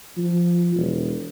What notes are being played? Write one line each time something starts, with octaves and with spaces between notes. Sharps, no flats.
F3
E1